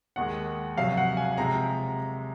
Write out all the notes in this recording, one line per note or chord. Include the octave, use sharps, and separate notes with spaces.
D#2 D#3 G#3 F#5
F1 F2 C3 F#3 F5
F#5
G#5
C3 F3 G#3 A#5